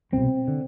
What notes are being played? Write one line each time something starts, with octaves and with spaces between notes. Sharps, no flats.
C2 B2 C4
D3